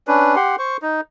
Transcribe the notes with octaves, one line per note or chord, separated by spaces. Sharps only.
C#4 D4 B4
G4 F#5 C6
C5 C#6
D#4